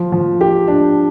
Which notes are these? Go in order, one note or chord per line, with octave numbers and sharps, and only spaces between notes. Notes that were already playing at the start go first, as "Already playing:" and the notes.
Already playing: F3
F3
G4
D4